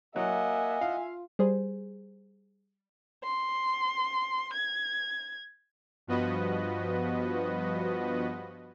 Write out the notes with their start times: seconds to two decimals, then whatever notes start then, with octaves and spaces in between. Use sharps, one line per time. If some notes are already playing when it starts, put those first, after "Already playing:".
0.16 F#3 A#3 D#5 E5 F#5 G#5
0.81 F4 F5
1.39 G3 G#4 C5
3.24 C6
4.53 G#6
6.07 G2 F3 B3 F#4 B4 D#5